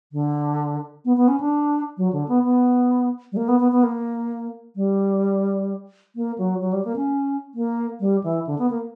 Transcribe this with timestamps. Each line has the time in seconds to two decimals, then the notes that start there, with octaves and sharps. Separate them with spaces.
0.12 D3
1.05 B3
1.17 B3
1.28 C#4
1.40 D4
1.97 F#3
2.13 D3
2.28 B3
2.44 B3
3.32 G3
3.37 A#3
3.48 B3
3.60 B3
3.72 B3
3.83 A#3
4.76 G3
6.16 A#3
6.38 F#3
6.61 F#3
6.73 G3
6.85 A#3
6.96 C#4
7.54 A#3
8.00 G3
8.24 E3
8.47 D3
8.59 B3
8.70 A#3